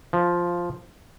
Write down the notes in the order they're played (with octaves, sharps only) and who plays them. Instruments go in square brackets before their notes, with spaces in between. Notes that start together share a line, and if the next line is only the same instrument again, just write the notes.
[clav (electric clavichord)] F3